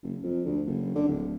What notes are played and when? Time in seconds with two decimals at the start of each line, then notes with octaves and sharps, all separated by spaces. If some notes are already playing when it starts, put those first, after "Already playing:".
0.03 F#1
0.23 F2
0.45 D2
0.66 F#1
0.95 D3
1.08 D1